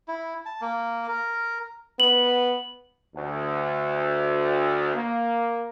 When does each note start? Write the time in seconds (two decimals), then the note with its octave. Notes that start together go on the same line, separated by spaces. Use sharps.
0.08 E4
0.46 A5
0.61 A#3
1.08 A#4
2.00 B3 F#7
3.15 D2
4.95 A#3